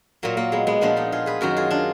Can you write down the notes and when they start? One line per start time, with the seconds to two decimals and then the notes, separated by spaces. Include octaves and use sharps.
0.23 A#2 F#3 A#3
0.37 A#3
0.52 G#3 B3
0.67 G#3 B3
0.81 A#2 F3 A#3 D4
0.97 B3 D#4
1.12 F4 G#4
1.26 G#4 B4
1.41 F#2 D#3 F#3 F#4 A#4
1.57 F4 G#4
1.71 D4 F4